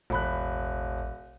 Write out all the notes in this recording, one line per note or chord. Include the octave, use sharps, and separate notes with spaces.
E1 A1 B5 F#6